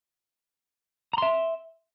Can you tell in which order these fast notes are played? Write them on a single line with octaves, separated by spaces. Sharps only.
A#5 C6 E5